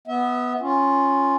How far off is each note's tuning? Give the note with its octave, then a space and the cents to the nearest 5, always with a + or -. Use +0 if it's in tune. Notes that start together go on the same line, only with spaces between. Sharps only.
B3 +0 E5 -30
C#4 -5 F4 +0